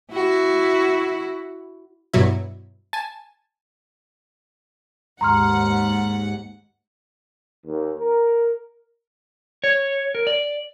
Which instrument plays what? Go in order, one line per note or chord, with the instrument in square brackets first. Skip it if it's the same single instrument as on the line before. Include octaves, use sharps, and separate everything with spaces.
[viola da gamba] E4 F#4
[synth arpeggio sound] G2 B2 F#3 E4
G#5 A5
[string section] D#2 G#2 F#5 [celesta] A#5 C6 F6
[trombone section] D#2
A#4
[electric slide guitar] C#5
A#4
D5